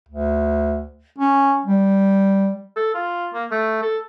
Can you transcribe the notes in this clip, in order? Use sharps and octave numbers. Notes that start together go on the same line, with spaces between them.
D2
C#4
G3
A4
F4
A#3
A3
A4